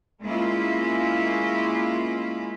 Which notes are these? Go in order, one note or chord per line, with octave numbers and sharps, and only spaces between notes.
G#3 A#3 C#4 E4 F4